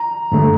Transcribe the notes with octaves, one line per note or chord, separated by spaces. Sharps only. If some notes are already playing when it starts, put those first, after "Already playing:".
Already playing: A#5
G2 D3 A3